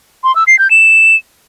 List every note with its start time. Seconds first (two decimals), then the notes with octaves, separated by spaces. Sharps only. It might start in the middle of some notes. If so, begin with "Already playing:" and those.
0.24 C6
0.36 E6
0.47 C7
0.59 G6
0.71 E7